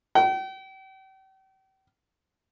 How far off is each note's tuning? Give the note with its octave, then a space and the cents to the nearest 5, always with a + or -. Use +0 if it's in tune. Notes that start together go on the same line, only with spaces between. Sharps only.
G5 -40